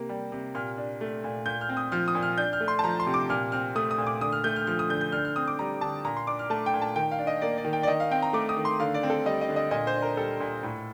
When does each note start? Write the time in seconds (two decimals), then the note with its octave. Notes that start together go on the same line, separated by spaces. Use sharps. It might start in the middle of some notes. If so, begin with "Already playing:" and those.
Already playing: C3 A#3
0.09 G3
0.32 C3
0.55 A#2 F6
0.78 D4
1.01 A3
1.24 A#2
1.46 A#2 G6
1.61 F6
1.69 C4
1.77 D#6
1.92 F3 F6
2.08 D#6
2.15 A#2
2.22 F6
2.38 D4 G6
2.53 F6
2.61 A3
2.68 C6
2.79 A5
2.84 F3 A#5
3.00 C6
3.06 C3
3.14 D6
3.29 A#2 F6
3.52 C4 F6
3.76 A3 D#6
3.91 D#6
3.98 A#2
4.07 D6
4.21 D3 D#6
4.32 F6
4.44 A3 G6
4.56 F6
4.67 F3 F6
4.79 D#6
4.90 D3 G6
5.01 G6
5.12 D3 F6
5.25 F6
5.36 C4 D#6
5.47 D6
5.59 G3 A#5
5.81 D3 A5
6.04 A#2 A#5
6.16 C6
6.27 D4 D6
6.39 F6
6.50 A3 A5
6.66 G5
6.74 A#2
6.82 A5
6.96 D#3 G5
7.11 F5
7.19 D4
7.27 D#5
7.42 A#3 D5
7.58 D5
7.64 D#3
7.73 G5
7.83 D5
7.87 D#3 D#5
8.00 F5
8.11 C4 G5
8.22 A#5
8.33 A3 D6
8.49 D#6
8.56 D#3
8.65 C6
8.80 D3 F5
8.94 D5
9.03 C4
9.10 A4
9.26 G3 D#5
9.41 D#5
9.49 D3
9.56 D#5
9.71 A#2 D#5
9.87 C5
9.94 D4
10.02 A#4
10.17 G3 A4
10.40 A#2
10.63 A2